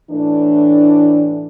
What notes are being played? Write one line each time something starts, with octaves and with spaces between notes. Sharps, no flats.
A2 E3 A3 D4